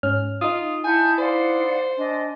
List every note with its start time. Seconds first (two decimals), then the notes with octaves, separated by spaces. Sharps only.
0.03 G#2 C#4 F6
0.41 D#4 F4 D#6
0.84 E4 F#5 G#5 A5 G6
1.18 C5 D5 F5 F#5
1.97 D4 D#5 G#5